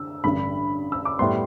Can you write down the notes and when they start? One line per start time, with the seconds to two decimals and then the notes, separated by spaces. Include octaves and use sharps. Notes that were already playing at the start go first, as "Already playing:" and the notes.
Already playing: D3 E6
0.24 A1 G2 D3 B5
0.92 E6
1.05 D6
1.19 A2 G3 B3 C6